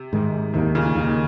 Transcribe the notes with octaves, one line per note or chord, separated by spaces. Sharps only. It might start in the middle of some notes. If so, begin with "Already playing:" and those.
Already playing: C3
G#2 D#3 G#3
D#2 C3 D#3 A#3
A#2 C#3
D#2 D#3 A#3